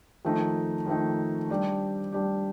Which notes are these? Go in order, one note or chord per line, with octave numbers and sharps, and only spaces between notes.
F2 D#3 A3 D#4
F2 D#3 A3 D#4
G3 D4 G4
G3 D4 G4